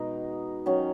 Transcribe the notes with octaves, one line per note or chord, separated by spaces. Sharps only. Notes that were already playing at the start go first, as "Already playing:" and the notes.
Already playing: B2 G#3 D#4
D#3 F#3 C#4